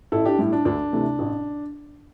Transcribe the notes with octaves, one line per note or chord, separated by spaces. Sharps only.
A1 E4 A4
D4 G4
A2 G3 E4
D4
D2 D4
C3 E3 A3
A1